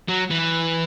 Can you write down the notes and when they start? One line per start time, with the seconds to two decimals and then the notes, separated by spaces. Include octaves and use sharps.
0.09 F#3
0.31 E3